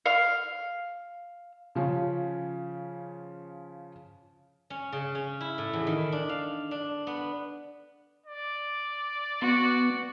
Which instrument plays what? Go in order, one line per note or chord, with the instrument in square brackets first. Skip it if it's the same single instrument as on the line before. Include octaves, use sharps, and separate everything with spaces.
[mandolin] F5
[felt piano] C#3 F3 C#4
[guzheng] C#4
C#3
C#4
E4
A2
E2
D#3
D4
F5
D4
B3
[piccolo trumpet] D5
[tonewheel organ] B3 [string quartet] F#4